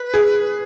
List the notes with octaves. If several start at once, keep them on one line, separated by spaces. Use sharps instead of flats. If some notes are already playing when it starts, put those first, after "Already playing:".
Already playing: B4
G#4